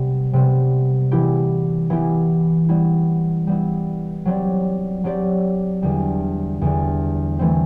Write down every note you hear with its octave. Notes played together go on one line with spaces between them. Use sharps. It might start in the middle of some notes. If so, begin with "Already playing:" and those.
Already playing: C3 G3 B3
C3 G3 B3
E3 B3 E4 G4
E3 B3 E4 G4
G3 B3 E4
G3 B3 E4
F#3 C4 G4 D5
F#3 C4 G4 D5
E2 D3 G3
E2 D3 G3
E3 A3 C4